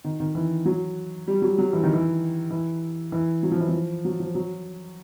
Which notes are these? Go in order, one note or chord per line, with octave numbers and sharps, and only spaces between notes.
D#3
D#3
E3
F#3
G3
F#3
F#3
E3
D#3
E3
E3
E3
F#3
F3
E3
F3
F#3
F3
F#3